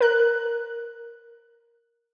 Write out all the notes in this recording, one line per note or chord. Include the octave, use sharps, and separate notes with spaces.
A#4 F#6